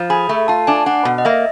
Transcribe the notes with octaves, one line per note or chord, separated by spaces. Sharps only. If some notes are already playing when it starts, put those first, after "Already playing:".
Already playing: F3
G#4 B5
A3
F4 A5
D4 G#5
D4 F#5
B2
D#5
A#3 E5